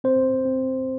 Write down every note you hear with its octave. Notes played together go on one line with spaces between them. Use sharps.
C4 C5
C4